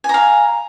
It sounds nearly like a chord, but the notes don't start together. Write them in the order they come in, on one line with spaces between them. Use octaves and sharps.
G#5 A#5 F5